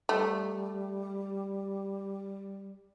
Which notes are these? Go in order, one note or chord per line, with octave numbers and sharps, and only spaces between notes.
G3 A3